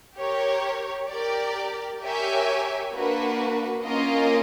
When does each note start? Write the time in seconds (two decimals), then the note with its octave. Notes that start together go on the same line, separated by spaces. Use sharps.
0.18 G4 A#4 C#5
1.09 G4 A#4 D5
2.02 G4 A#4 C#5 E5 G#5
2.93 A#3 D4 F#4 B4
3.85 A#3 C#4 F4 A#4 D#5